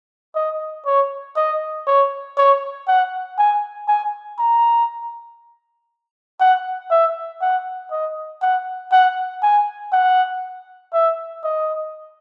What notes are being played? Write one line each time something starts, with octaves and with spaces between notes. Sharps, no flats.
D#5
C#5
D#5
C#5
C#5
F#5
G#5
G#5
A#5
F#5
E5
F#5
D#5
F#5
F#5
G#5
F#5
E5
D#5